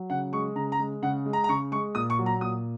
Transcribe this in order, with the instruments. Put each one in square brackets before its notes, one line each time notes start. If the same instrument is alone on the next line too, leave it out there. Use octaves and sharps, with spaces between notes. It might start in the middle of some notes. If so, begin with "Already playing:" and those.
Already playing: [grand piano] F#3
C#3 F#5
G#3 C#6
C#3 A#5
A#5
G#3
C#3 F#5
G#3
A#5
A#5
C#3 C#6
G#3 C#6
A#2 D#6
C#6
F#3
A#5
A#2 D#6